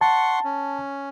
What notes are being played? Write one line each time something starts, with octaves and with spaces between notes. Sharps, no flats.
F#5 A5 C6 C#6
C#4